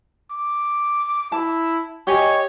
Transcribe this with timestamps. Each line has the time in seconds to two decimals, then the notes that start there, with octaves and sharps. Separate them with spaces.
0.31 D6
1.32 E4 A5
2.07 G4 C#5 D#5 G#5